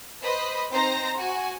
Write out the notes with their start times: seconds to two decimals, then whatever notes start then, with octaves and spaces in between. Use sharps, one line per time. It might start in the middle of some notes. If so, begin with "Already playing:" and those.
0.22 B4 C5 D#5 B5 D#6
0.71 C4 D#4 C5 A#5 A#6
1.16 F#4 G#5